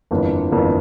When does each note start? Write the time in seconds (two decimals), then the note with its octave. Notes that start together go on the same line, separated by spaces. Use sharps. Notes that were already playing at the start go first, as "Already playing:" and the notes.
0.11 G1 F2 E3 A#3 D4
0.51 G1 F2 E3 A#3 D4